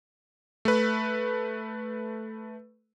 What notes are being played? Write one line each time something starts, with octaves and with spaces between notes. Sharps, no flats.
A3 B4